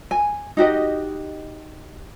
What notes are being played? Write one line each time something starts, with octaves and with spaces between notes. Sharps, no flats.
G#5
D#4 F#4 G4 D#5